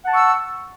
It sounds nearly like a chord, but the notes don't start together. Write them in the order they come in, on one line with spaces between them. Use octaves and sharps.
F#5 A5 C#6 E6